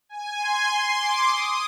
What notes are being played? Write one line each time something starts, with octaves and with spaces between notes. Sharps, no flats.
G#5
C6
D6
D#6